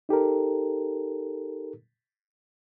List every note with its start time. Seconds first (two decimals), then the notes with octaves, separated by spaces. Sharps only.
0.09 D#4 G4 A4 A#4